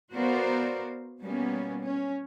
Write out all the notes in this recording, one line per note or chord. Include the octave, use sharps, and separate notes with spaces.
B3 F#4 A#4 C5 D5 F5
B2 G3 A#3 B3 C#4
C#4